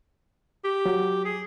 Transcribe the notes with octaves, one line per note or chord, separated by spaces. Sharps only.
G4
F#3
G#4